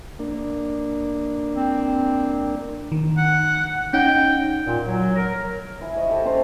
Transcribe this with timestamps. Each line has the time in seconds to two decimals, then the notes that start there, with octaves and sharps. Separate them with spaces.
0.19 A#3 D4
1.55 C4
2.92 D#3
3.17 F#5
3.93 C#4 D#4 F#5 G5
4.66 A#2
4.86 F#3
5.15 A#4
5.81 E4 G#5
5.97 C#5 D#5
6.09 G4 A4 E5
6.25 C#4 A4 C5 A#5